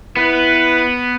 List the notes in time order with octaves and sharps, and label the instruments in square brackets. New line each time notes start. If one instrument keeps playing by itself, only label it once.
[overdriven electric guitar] B3 [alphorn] E4 [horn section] B4